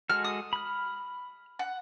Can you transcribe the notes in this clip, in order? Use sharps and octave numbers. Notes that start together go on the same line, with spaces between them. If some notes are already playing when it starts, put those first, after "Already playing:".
G#3 F#4 A4 F6
D#6
B5 F6
F#5